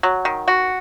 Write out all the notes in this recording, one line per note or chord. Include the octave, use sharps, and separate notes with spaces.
F#3
D#3
F#4